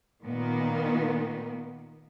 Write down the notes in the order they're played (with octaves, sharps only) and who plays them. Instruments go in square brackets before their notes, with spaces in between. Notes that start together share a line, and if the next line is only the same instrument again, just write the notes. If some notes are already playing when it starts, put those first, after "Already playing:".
[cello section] A#2 D#3 A#3 B3